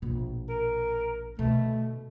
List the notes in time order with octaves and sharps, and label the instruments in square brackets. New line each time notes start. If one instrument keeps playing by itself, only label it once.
[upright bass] A#1 B2
[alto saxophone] A#4
[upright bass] B2 D3 [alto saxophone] A3